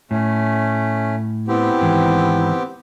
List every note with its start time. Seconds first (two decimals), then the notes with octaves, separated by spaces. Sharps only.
0.11 A2 A3 C#4
1.48 B3 C4 E4 G4
1.81 G#2 D#3 E3